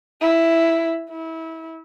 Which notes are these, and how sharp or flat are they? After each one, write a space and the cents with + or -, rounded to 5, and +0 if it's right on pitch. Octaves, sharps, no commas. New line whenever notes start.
E4 +5
E4 -25